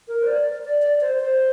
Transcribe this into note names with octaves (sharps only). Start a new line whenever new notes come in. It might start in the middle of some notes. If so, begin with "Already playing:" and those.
A#4
C5
D5
D5
D5
C5
C5